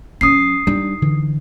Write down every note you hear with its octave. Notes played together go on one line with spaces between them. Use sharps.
F#3 C#4 D#6 C7
G3 D4 D#4
D3 E3